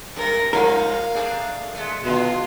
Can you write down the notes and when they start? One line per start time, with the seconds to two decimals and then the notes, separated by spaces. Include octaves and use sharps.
0.16 F#2 A#4 A#6
0.53 G2 F3 D#4 A#4 F5
1.14 A3 D4 G#4
1.75 G#3 A3
2.04 B2 D3 G#3 F4